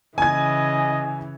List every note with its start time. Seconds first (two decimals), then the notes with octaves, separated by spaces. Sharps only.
0.18 C#3 E3 D#5 G#5 G#6